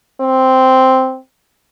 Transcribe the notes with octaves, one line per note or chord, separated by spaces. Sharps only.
C4